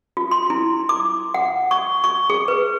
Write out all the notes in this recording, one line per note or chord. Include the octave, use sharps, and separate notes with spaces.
F4
C6
E4
D6
F#5
C#6
C#6
G#4
B4